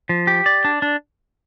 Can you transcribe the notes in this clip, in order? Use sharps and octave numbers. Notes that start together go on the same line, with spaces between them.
F3
G4
D5
D4
D4